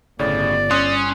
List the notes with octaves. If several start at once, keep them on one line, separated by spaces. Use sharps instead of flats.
G1 A2 C#3 D5
C#4 C6 D#6 F#6